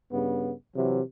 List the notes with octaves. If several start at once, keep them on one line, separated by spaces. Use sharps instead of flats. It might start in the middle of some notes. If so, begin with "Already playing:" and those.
G2 C#3 B3
C3 E3 F#3